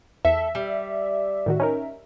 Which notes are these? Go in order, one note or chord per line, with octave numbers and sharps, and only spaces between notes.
E2 A4 E5
G3
A2 D#3 F#4
C#4 D#4 A#4